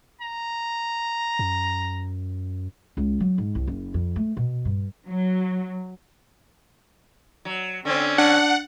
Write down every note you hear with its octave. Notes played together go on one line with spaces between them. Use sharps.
A#5
F#2
C#2
F#3
G#2
C2
F#1
F2
A3
B2
G2
F#3
F#3
D3 C4 C#4
D4 F#5